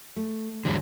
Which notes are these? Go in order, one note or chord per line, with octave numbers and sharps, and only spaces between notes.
A3
E2 G#2 D3 F#3 G3 G#4